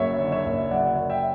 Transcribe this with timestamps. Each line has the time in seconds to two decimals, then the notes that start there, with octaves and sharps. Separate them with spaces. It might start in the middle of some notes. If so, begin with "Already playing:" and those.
Already playing: F#1 F#2 C#5 E5
0.19 D3
0.32 C#5 E5
0.45 F#1
0.71 F#2 D5 F#5
0.97 F#1
1.09 E5 G5